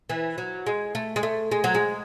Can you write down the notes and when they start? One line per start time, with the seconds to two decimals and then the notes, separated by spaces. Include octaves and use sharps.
0.09 E3
0.38 F#3
0.66 G#3
0.95 A3
1.16 G#3
1.23 A3
1.51 G#3
1.64 F#3
1.74 G#3